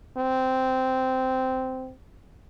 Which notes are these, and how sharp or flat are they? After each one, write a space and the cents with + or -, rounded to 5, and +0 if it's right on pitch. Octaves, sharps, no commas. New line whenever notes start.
C4 -10